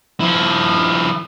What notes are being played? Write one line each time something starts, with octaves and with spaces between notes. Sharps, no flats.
F3 E4